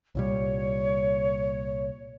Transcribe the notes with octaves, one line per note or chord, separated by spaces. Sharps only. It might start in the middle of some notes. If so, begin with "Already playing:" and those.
C2 A#2 G3 C#5